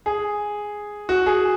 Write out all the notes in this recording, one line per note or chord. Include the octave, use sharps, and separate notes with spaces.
G#4
F#4
G#4